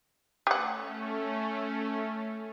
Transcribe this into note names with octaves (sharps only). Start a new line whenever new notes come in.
A3 C#4 G4 F#5